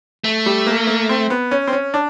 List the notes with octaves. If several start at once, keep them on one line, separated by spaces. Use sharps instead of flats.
A3
G3
A#3
A#3
C4
B3
C#4
C4
C#4
D4